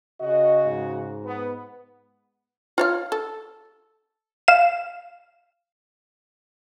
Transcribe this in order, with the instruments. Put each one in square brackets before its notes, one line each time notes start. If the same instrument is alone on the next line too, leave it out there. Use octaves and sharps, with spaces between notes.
[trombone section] C#3 F#4 [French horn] D#5
[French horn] G#2
[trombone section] B3
[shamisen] F4 C#5 F5
A4
[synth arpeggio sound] F5 E7